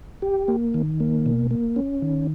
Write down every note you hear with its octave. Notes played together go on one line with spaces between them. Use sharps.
G4
A#3
D#3
A#3
B2
A#3
C#4
D#3